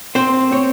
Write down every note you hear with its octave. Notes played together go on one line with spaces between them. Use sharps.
C4 C5
C4 C#5